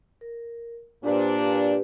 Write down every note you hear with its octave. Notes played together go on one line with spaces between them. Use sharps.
A#4
A#2 D4 G4 B4 C5
G4 B4